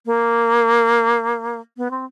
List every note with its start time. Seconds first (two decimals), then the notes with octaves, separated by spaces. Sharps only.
0.06 A#3
1.77 B3
1.91 C4